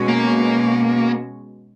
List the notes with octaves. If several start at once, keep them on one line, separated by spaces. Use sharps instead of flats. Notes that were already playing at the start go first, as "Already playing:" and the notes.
Already playing: B2 G#3 C#4 F#4
A#3